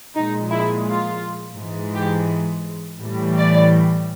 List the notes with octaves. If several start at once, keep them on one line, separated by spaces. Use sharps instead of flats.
A#2 F3 G#3 D#4
E4
F4
G#2 E3 G#3
G4
A2 E3 G3
D5